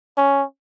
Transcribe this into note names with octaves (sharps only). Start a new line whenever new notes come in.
C#4